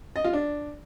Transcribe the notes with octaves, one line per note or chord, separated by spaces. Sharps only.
D#5
F4
D4